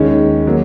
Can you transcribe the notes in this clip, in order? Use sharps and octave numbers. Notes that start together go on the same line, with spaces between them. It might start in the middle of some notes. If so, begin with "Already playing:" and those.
Already playing: D#2 D#3 G#3 C#4
F#3 A#3